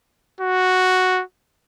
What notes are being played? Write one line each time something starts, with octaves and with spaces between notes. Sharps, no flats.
F#4